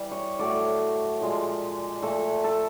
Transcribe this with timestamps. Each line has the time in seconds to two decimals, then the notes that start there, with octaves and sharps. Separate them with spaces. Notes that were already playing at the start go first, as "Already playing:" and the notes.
Already playing: E3 G3
0.12 C#5
0.39 A2 F#3 A3 D5
1.21 A#2 F3 G#3
2.02 A#2 F3 A3 A4
2.44 A4